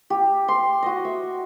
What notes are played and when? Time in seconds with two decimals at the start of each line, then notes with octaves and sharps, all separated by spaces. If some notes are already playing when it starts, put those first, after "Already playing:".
0.10 G4
0.48 C6
0.83 F#4 D#5
1.05 E5